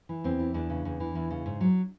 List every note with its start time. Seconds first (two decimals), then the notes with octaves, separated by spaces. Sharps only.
0.09 E3
0.24 E2 C4
0.39 E3
0.54 E2 D4
0.70 C#3
0.85 E2
1.00 E3
1.15 E2
1.30 C#3
1.46 G#2
1.61 F#3